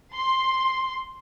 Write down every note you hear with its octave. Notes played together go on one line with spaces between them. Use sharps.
C6